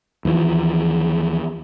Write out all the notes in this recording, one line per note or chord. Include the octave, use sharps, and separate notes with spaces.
D#2 E3 F3